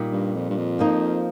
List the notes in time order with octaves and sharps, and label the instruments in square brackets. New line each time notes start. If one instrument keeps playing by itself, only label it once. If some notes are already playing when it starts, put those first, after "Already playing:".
Already playing: [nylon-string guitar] A#2 G3 D#4
[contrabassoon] G2
F2
G2
F2
[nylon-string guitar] F3 A#3 D#4